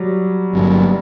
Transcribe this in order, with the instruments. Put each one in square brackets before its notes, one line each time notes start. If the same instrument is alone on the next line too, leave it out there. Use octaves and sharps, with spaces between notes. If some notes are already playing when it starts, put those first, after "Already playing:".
Already playing: [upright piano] F#3 G3
[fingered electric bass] G1 G2 F#3